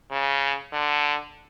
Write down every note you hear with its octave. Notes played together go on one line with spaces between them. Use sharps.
C#3
D3